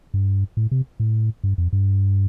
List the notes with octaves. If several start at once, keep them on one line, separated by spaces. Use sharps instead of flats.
G2
A2
C3
A2
G2
F2
G2